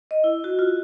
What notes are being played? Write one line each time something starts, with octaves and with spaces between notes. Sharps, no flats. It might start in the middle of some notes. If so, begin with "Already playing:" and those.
D#5
E4
F#4
F4